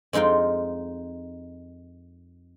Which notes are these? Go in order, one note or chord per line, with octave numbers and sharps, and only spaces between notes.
F2 G#3 D#4 F4 G5